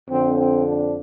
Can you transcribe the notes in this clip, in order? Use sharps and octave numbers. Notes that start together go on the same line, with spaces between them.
F2 D3 C4
C4
D4